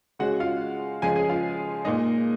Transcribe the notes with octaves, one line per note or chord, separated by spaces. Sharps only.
C#3 G#3 F#4 F#5
F4 F5
C#3 F3 G#3 G#4 G#5
G#4 G#5
F4 F5
A#2 G#3 D#4 D#5